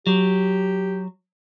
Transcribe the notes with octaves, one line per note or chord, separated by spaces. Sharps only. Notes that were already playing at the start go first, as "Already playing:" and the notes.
F#3 G4